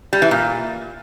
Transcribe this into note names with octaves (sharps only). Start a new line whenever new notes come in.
G3
E3
A#2